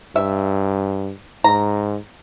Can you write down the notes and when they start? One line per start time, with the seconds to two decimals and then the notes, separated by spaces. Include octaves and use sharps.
0.16 G2 E5
1.44 G#2 A#5